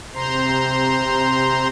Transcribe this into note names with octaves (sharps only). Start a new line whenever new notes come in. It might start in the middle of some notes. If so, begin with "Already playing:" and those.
C3 C5 A#5 C6